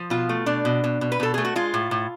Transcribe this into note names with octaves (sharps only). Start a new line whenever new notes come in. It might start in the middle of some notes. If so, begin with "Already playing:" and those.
Already playing: F3
B2 F4
A3
B2 D4
B2
B2
B2
B4
B2 A4
A3 G#4
F#4
G#3 F4
A2
A2